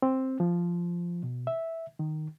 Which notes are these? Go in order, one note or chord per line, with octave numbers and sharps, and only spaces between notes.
C4
F3
B2
E5
D#3